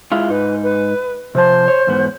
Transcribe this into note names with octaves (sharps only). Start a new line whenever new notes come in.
G#3 E4 F4
G#2 D#4 B4
B4
C3 F3 C5 A5
C#5
E2 G#2 B3